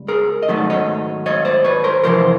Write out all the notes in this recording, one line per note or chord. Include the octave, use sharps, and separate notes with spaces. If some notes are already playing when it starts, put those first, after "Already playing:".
Already playing: C#2 G3
G#4 A#4
D#5
G#2 D#3 F#3 A3
D5
C#5 D#5
C#5 D#5
C5 D5
B4 C#5
A#4 C5
F2 C3 E3 A#4 C5